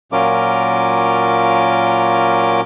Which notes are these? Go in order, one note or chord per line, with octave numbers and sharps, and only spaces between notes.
A#2 F#3 C#4 F4 A#4 D6